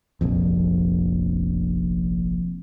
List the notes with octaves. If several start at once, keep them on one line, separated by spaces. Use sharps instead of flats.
F1 A#1 F2